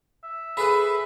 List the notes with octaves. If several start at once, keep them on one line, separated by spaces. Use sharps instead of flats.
E5
G#4 A4 B4 B5